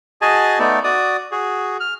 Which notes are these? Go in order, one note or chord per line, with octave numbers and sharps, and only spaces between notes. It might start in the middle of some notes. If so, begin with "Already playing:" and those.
F#4 G#4 D#5 G#5 A5
A3 B3 D#4 D5
F#4 D5 D#6
F#4 G#4
F6